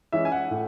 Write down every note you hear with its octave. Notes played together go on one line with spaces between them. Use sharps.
E3 G#3 C#4 E5
G#5
F#5
A2